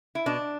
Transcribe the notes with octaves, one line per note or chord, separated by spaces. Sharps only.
E4
B2 D4